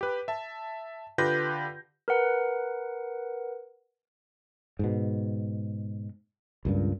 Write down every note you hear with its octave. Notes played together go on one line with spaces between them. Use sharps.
G4 B4
E5 A5
D3 F4 G4 B4 G6 A#6
A#4 B4 F#5
G#2 B2
C#2 G2 A#2